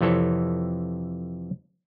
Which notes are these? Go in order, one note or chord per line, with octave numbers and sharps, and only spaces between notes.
F2 C3 E3 A4 C#5